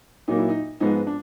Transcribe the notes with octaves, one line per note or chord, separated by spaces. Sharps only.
A#2 F#3 A#3 D#4
E4
D#4
G#2 F3 G#3 B3 D#4
D4